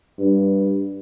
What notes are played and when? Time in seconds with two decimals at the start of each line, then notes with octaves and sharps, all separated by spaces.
0.19 G2